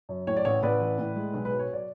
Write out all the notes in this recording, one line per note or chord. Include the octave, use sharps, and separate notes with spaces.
F#2
A2 C#5
D5
A1 C#5
A1 B4 D5
E3
A2
G#3
B1
B4
F#3
C#5
D5